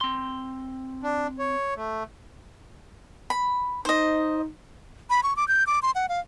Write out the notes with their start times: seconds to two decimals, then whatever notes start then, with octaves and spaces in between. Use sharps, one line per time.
0.01 C4 C6
1.03 D4
1.39 C#5
1.76 A3
3.30 B5
3.85 D#4 C5 D#5
5.10 B5
5.23 C#6
5.36 D6
5.48 G6
5.67 D6
5.82 C6
5.95 F#5
6.09 F5